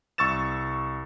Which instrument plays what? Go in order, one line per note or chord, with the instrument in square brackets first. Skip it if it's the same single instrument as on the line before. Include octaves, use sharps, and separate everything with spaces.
[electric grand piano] C2 C#6 E6 A6 E7